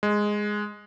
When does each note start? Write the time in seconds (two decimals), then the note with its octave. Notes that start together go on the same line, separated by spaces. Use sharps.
0.03 G#3